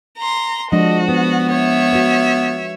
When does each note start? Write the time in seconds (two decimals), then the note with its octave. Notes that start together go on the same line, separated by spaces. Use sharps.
0.18 A#5 C6
0.72 F3 G#3 D4 F#4 D#5
1.08 B3 B4
1.53 C#5 E5
1.93 F#4 B4